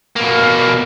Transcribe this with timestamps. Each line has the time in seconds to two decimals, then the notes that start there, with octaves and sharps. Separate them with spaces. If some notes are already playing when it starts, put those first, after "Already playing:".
0.16 B2 A#3